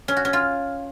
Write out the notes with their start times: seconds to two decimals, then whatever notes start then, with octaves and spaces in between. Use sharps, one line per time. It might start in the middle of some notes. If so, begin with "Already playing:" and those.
0.08 C#4
0.17 F#4
0.25 C#4
0.33 F4